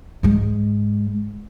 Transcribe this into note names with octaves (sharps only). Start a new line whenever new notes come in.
G#2 G#3